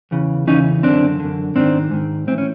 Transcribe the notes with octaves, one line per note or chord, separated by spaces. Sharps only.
E2 C#3 E3
E2 C#3 E3 C#4 D#4
F#2 D3 C4 D4
F#2 D3
G#2 D#3 C4 D4
G#2 D#3
A2 E3 C4
C#4